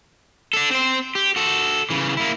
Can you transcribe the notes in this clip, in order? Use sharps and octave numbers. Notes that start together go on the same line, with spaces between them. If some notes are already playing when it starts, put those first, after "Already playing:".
D4 A4
C4 C5
G4
F#4 A4
C#3 E3
A#3 E4